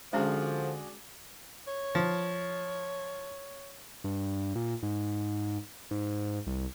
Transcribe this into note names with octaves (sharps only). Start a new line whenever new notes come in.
D3 F3 G#3 C#4 D4 F#4 G#4
C#5
F3
G2
A#2
G#2
G#2
C2